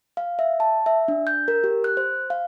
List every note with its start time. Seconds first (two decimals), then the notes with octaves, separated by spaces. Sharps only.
0.17 F5
0.39 E5
0.60 A5
0.86 E5
1.08 D4
1.27 G6
1.48 A#4
1.64 G4
1.84 F#6
1.97 C5
2.30 F5